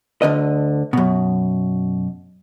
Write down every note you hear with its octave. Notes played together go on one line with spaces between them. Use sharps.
D2 D3 D#5
F#2 B2